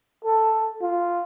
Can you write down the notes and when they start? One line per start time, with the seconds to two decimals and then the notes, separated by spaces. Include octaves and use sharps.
0.25 A4
0.82 F4